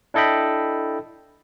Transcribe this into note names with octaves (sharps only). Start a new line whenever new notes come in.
D4 E4 A4 D#5 G5 B5